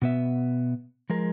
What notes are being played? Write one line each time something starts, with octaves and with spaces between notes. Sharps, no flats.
B2 B3 E5
F3 G#3 A#4